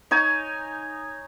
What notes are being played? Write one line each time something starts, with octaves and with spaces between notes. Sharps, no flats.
D#4 C#5 G#5